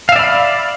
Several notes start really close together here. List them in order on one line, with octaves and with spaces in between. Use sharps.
F5 E5 D5 B5